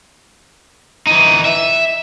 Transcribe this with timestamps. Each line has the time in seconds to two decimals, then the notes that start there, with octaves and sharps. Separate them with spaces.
1.07 E3 D#4
1.45 E5